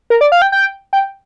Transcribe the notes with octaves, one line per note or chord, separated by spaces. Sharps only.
A#4
D5
F5
G5
G5
G5